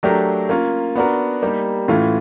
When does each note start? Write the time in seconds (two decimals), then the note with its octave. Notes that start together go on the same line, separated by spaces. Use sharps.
0.03 F#3 A3 D4 G4 A#4
0.49 A#3 C#4 F4
0.95 B3 D4 F#4 A#4
1.42 G3 A#3 D#4 G4
1.88 A2 E3 A3 C#4 F4